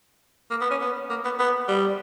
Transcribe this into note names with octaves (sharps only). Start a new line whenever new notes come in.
A#3
B3
C#4
B3
A#3
B3
B3
G3